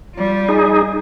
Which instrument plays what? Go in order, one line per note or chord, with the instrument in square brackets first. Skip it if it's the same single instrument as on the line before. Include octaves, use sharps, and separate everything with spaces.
[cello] G3 F4
[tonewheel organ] D#4 G#4